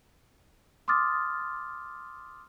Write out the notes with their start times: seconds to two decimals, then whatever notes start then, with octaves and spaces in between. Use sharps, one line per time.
0.88 C6 D6 D#6 F6 A6